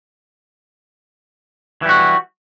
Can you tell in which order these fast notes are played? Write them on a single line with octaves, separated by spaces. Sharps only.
E3 G3 F#4